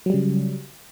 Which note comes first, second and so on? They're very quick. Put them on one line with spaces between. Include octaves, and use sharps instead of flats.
F#3 G3 C#3